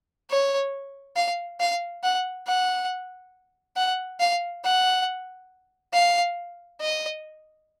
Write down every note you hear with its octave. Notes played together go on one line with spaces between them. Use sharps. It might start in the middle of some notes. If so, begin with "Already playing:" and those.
C#5
F5
F5
F#5
F#5
F#5
F5
F#5
F5
D#5